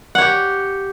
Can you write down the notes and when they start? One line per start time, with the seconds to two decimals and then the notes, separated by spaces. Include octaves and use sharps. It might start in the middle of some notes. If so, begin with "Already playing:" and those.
0.15 F#5
0.18 C#5
0.21 G4